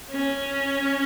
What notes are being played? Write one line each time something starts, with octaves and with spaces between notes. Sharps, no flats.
C#4